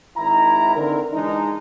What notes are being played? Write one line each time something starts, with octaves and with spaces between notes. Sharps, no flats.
G#1 D#3 E4 A#5
D3 E3 C4 D#4 A#4
E3 G#3 D4 D#4